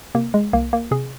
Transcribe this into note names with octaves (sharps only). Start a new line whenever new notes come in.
C3 A#3
G#3
C2 A#3
A#3
C3 G#4